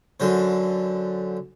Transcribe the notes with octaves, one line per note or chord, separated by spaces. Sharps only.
F#2 D3 C5